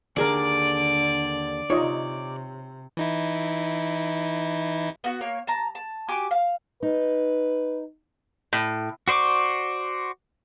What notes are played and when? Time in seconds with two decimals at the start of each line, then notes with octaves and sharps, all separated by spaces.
0.17 D#2 D3 G#4 A#4 D5
1.70 C3 D#4 F4 C#5 D#5
2.97 E3 D#4 E4
5.04 B3 F#4
5.21 A#3 C#5
5.47 A5 A#5
5.75 A5
6.08 F#4 G4 G#5 D6
6.31 F5
6.83 D#4 B4
8.53 A2
9.08 F#4 C5 D5 C#6 D6